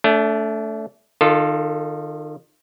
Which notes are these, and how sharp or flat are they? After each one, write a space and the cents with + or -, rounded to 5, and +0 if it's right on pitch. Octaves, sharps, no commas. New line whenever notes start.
A3 +0 D4 -35
D#3 -35 F4 +0 A4 +0